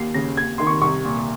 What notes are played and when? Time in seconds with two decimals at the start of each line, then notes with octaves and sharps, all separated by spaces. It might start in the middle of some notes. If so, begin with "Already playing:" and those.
Already playing: D#2 C7
0.14 C#3 A#6
0.37 D#2 G#6
0.58 D#3 C6
0.67 C#6
0.82 C2 C#6
1.04 A#2